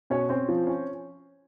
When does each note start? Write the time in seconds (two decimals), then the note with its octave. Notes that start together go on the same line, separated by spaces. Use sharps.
0.10 B2 C#4 C#5
0.29 C4 C#4 C5
0.49 F3
0.67 C#4